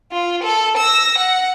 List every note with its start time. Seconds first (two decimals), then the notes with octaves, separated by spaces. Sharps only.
0.12 F4
0.43 A4
0.78 E6 A#6
1.18 F#5